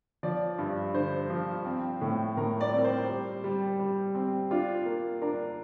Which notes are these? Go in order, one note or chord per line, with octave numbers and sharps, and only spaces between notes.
F3 D5
G2
D3 C5
F3
C4
A2
A2 A#4
D5
C4
A#4
C5
G3
G3
G3
C4
D4 F4
A#3
D4 A#4